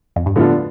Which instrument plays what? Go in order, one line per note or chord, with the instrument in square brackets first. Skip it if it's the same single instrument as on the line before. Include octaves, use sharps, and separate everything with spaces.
[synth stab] F2
G2
[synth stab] A2 [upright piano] D3 F3 B3 D4 F4